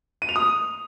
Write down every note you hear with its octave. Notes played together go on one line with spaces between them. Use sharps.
D#7
F7
D#6